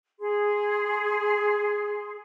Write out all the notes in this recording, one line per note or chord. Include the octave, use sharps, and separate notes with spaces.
G#4 C6